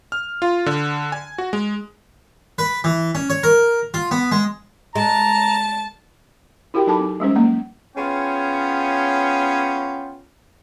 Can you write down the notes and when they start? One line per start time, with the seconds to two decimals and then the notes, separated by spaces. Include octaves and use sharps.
0.12 F6
0.42 F4
0.66 D3
1.12 G#5
1.38 F#4
1.53 G#3
2.58 B4
2.84 E3
3.15 C#4
3.30 C#5
3.43 A#4
3.94 F4
4.11 B3
4.32 G#3
4.96 G#3 A5 A#5
6.74 E4 F#4 G4 A#4 G5
6.87 F#3 D#4 A4 A5 B5 D6
7.00 C4
7.20 G3 G#3 C#4 C5
7.36 F#3 A#3 A#5
7.96 B3 C#4 F4 G#4 C#5 G5